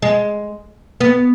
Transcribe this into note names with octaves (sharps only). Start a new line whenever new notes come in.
G#3
B3